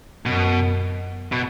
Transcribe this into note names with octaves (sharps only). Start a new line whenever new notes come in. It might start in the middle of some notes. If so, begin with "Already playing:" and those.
F#2 B2
B2